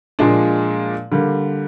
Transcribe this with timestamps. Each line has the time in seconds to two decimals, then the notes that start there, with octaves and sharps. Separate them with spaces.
0.19 A#2 F3 G#3 D4
1.12 D3 G3 A#3